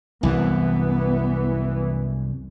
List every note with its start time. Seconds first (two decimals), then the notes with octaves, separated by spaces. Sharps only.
0.23 C2 F#2 E3 B3